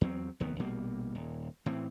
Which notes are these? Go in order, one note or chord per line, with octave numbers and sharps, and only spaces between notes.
E2 F#3 C4
F1 D#2 D#3 B3
A#1 B2 G3 A#3
D#1
A2 E3 C4